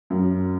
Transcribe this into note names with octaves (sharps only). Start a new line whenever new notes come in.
F#2